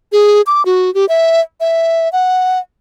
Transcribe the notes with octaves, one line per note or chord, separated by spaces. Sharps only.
G#4
D6
F#4
G4
E5
E5
F#5